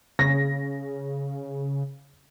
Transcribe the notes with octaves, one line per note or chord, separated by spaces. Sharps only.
C#3 A#6